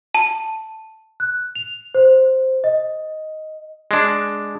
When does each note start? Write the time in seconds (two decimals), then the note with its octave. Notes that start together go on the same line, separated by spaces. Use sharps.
0.15 A5
1.20 F#6
1.55 F7
1.95 C5
2.64 D#5
3.91 G#3 D4